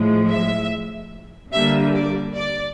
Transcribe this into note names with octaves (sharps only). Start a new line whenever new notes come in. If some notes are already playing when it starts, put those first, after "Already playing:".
Already playing: A2 F3 G#3
E5
D3 G3 A#3 E5
D5
D5